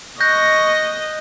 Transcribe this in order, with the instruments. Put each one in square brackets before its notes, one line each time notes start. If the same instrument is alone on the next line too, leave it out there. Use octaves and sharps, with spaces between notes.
[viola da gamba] D#5 [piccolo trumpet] C#6 [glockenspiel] F#6 G6 A#6